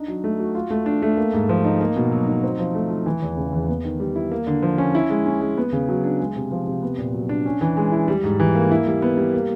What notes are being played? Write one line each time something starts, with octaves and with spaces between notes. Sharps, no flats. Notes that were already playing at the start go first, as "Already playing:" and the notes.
Already playing: D4 D#4
F#3
A3
F#4
F4
A3
D4
A3
A#3
G#2
F3
D#4
A#3
B2
F#3
D#4
C4
F3
A3
F4
E3
E2
C#3
E2
B3
D#3
G3
E4
A#3
D3
F3
C#4
E4
G#3
C#4
G#3
B3
C#3
F#3
D4
G#3
C3
F3
C3
B3
A#2
F#3
D4
C#4
E3
G#3
E4
G3
G#2
E3
A#3
E4
G3
B3
G3
A#3